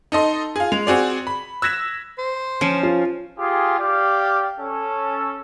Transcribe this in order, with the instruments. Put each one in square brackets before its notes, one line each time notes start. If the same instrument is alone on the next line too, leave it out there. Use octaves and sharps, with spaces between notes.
[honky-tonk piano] D#4 A4 D#5 C6
F4 G#4
G#3 F7
C4 F#4 G#4 D5
B5
E6 F#6 G#6 A#6 B6 E7
[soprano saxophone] C5
[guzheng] F3 [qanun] C#4
[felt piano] F4
[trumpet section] F4 G4 G#4
G4 D5 F5
C#4 A4